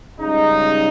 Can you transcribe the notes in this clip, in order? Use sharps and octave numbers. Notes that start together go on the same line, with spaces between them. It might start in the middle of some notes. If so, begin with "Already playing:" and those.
C#2 C#3 G3 D#4